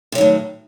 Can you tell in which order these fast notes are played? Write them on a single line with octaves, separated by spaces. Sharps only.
C3 F#3 D#3 A2